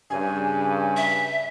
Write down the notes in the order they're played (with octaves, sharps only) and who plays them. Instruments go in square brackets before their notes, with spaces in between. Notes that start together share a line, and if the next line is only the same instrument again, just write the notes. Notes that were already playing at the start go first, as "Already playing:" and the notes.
[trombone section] G2 C#3 [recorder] G#5
[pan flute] E5